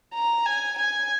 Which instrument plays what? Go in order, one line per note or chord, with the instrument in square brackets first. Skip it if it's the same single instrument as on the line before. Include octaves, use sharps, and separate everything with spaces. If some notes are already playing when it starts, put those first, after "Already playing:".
[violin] A#5
G#5
G#5